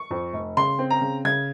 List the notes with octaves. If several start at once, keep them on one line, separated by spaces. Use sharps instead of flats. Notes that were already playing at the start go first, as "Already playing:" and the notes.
Already playing: C#6
F2
F1
C#3 C6
C4
A#5
C#3
C#3 G#6